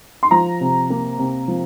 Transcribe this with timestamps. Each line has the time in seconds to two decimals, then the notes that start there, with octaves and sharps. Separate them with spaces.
0.23 C6
0.31 F3 A#5
0.61 C3
0.90 A#3
1.19 C3
1.48 F3